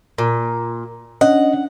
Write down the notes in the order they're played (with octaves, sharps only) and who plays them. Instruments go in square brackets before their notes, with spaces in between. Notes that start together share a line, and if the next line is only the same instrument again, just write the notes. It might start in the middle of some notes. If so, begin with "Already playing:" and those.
[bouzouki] A#2 [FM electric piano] A#4
[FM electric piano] C#4 D4 [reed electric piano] D#5 [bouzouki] F#5